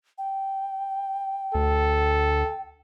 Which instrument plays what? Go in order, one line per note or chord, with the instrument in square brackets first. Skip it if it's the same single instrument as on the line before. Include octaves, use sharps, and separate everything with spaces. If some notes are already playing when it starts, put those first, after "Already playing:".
[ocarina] G5
[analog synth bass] D2 [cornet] A4